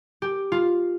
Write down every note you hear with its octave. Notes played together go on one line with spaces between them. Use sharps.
G4
F4